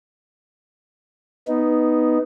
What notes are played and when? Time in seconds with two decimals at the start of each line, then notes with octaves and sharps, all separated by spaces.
1.48 B3 D#4